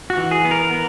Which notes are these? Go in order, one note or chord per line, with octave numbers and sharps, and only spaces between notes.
F#4
E3
G#4
B3
A#4
B3